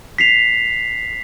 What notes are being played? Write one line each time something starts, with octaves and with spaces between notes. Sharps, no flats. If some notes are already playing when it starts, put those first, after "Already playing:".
B6 C7 F7